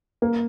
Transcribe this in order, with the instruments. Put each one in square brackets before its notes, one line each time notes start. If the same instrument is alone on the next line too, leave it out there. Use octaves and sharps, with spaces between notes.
[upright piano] A#3